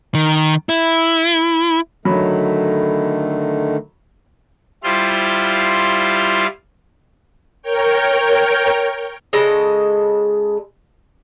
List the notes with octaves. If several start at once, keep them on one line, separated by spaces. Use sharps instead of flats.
D#3
E4
D3 D#3 F#3 A3 B5
G3 E4 F4 C5 F5 C6
A#4 C#5 G5
C#3 G#3 A4 D#5